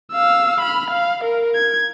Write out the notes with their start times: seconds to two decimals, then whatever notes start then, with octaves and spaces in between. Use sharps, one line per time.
0.13 F5 E6
0.61 B5 F6
0.91 F5
1.24 A#4
1.55 G#6